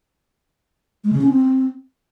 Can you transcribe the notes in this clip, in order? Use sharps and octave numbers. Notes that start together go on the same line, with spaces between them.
G#3
C#3
C#4
C4